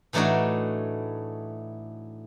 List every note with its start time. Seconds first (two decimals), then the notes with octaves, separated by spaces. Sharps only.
0.13 A2 E3 A3 D4 D#4 F#4